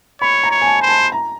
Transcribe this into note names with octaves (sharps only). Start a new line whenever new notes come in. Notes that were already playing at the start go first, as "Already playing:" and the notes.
C#5 B5
A#5
C#5
G#5
A5
C5
A5
A#5